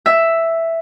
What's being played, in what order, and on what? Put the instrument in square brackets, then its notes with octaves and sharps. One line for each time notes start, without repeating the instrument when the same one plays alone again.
[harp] E5